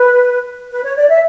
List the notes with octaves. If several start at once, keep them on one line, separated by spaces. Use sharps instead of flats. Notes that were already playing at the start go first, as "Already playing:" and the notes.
Already playing: B4
B4
C#5
D5
E5